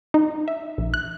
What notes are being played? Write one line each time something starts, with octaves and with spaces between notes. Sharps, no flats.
D#4
E5
A#1
F#6